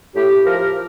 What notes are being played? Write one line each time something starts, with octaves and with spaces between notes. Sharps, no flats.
A2 G4
F3 A#4